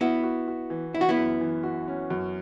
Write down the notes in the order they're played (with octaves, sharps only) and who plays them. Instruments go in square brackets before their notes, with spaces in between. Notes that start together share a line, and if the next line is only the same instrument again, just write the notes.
[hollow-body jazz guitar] B3 E4 [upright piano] F#4
[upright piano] F#4
F#4
E3
[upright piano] E3 [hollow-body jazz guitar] E4
[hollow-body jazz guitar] F#4
B3 E4
[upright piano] F#2
E3
F#4
C#4
F#2